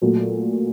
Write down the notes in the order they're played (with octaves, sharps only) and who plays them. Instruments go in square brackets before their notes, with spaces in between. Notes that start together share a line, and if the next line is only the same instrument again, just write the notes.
[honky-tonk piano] A#2 F#3 A3